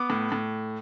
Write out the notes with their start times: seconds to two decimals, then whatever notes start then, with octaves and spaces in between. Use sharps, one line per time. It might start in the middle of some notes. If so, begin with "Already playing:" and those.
Already playing: B3 D6
0.10 A2
0.32 A2